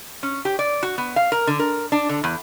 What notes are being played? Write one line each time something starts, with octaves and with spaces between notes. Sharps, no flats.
C#4
G4
D5
F#4
B3
F5
A#4
D3
A#4
D4
D3
E2